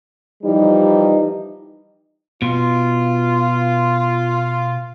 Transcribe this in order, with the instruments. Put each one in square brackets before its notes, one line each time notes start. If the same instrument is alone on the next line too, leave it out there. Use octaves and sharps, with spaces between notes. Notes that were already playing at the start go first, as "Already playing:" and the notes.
[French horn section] E3 F3 G3 D#4
[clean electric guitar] B2 [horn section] F4